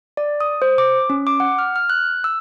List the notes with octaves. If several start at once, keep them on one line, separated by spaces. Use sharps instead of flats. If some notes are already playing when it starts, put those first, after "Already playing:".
D5
D#6
C5
D6
C#4
D6
F#5
F6
F6
F#6
E6